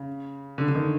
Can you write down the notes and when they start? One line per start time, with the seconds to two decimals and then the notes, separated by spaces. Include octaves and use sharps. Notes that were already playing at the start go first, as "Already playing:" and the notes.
Already playing: C#3
0.58 D3
0.68 D3
0.75 D#3